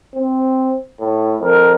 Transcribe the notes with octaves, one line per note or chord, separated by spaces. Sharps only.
C4
A2
F2 A#4